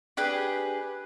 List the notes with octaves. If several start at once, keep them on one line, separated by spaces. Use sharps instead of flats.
D4 G4 G#4 B4